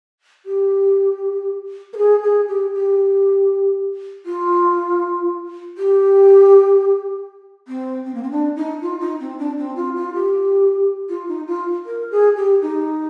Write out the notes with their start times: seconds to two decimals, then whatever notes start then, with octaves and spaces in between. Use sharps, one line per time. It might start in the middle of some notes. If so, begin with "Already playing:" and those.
0.45 G4
1.93 A#4
1.97 G#4
2.23 G#4
2.48 G4
2.73 G4
4.25 F4
5.77 G4
7.67 C4
8.05 C4
8.14 A#3
8.23 C4
8.31 D4
8.56 D#4
8.81 F4
9.00 D#4
9.20 C4
9.38 D4
9.58 C4
9.76 F4
9.96 F4
10.14 G4
11.09 F4
11.28 D#4
11.47 F4
11.86 A#4
12.11 G#4
12.37 G4
12.61 D#4